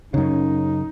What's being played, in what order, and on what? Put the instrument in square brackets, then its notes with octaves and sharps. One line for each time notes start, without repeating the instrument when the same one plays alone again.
[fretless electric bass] F#2 C#3 [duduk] D#4